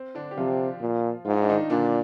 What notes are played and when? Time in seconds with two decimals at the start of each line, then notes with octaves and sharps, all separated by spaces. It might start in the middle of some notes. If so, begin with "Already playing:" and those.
Already playing: C4
0.15 D3 D4
0.31 G4
0.37 C3 F3 F4
0.81 A#2
1.25 G#2 F4
1.33 D#4
1.42 D4
1.49 D#3 D#4
1.70 A#2 D3 D4